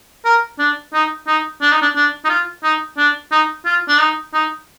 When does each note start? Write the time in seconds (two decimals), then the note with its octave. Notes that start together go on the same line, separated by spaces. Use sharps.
0.25 A#4
0.59 D4
0.93 D#4
1.27 D#4
1.61 D4
1.72 D#4
1.82 D4
1.96 D4
2.25 D#4
2.29 F4
2.63 D#4
2.98 D4
3.32 D#4
3.66 F4
3.88 D4
4.00 D#4
4.34 D#4